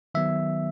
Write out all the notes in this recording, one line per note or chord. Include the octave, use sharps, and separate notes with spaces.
D#3 F#3 B3 E5